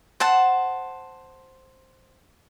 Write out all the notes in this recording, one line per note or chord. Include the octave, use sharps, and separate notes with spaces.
C5 F#5 A5